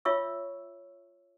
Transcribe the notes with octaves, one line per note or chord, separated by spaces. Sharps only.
F4 C#5 E5 C#6 E6